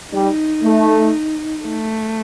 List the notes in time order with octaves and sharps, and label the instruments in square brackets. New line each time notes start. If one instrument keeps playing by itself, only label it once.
[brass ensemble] G3 [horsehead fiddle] D#4
[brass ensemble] A3
[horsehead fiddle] A3